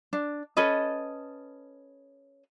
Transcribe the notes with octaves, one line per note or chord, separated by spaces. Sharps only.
D4
C#4 A4 B4 D#5